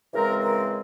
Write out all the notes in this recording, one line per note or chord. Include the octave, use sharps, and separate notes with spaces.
C#3 E3 G#3 C4 A#4
A#4